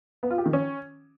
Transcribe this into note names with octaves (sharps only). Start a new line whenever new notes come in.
B3
F4
G4
D#3
C#4